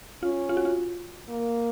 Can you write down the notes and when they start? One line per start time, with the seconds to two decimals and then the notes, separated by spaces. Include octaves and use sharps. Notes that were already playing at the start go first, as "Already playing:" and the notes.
0.23 C#4 F4
0.49 F4
0.57 F#4
0.65 F4
1.30 A#3